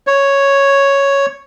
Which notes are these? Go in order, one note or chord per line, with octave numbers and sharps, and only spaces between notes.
C#5